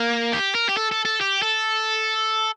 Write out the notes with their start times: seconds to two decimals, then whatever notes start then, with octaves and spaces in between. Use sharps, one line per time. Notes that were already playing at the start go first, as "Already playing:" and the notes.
Already playing: A#3
0.33 G4
0.55 A#4
0.69 G4
0.77 A4
0.92 A4
1.05 A4
1.21 G4
1.42 A4